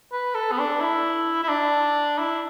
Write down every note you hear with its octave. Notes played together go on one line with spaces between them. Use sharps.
B4
A4
B3
D4
E4
E4
D4
E4